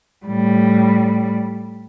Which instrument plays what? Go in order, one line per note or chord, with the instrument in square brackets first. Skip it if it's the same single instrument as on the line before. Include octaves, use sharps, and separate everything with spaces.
[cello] A2 G3